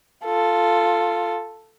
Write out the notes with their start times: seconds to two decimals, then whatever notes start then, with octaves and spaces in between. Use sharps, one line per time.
0.25 F4 A4